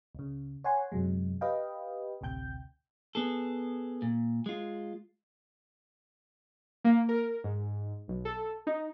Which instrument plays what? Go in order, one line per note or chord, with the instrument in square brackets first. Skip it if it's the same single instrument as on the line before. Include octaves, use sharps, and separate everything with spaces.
[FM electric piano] C#2 C#3
C#5 F#5 G#5 C6
F#2 C3 F#3 G#3
G4 B4 D#5 F5 G5
A1 D2 C3 G5 G6
[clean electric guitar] B3 G#4 A4
A#2
G#3 F4
[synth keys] A#3
A#4
G#2
B1
A4
D#4